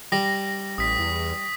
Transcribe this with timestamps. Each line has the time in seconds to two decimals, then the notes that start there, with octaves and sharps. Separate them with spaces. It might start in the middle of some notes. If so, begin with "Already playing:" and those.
0.12 G3 A#6
0.78 A1 D#6 B6
0.99 E2